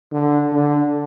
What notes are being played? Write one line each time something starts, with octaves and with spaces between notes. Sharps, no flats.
D3
D3